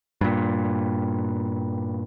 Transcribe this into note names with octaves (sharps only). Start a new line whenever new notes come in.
G2 A#2